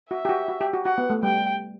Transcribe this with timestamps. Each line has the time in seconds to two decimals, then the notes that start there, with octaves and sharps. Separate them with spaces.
0.10 F#4 E5
0.25 G4
0.29 F#4
0.48 F#4
0.61 G4
0.73 F#4
0.85 F#4 F#5
0.98 B3
1.10 A3
1.23 G3 G5